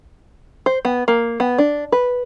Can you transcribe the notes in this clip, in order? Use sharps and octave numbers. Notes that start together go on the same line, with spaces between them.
C5
B3
A#3
B3
D4
B4